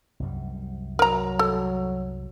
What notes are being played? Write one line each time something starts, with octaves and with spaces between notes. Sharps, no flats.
C2 F#2 G3
F#3 A#4 A#5
A4